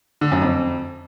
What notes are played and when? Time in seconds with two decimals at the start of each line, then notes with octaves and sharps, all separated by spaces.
0.21 D3
0.32 F#2
0.42 F2